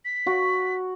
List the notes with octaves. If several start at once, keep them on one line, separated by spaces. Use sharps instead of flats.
B6
F#4